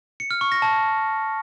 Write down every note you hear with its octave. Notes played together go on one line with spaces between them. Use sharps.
C#7
F6
C#6
A#6
A5